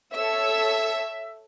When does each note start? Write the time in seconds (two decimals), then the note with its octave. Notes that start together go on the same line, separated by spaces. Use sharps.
0.13 A4 C#5 E5 E6